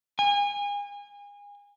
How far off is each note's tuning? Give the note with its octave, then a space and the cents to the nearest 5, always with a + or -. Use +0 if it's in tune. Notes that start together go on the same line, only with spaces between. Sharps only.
G#5 -30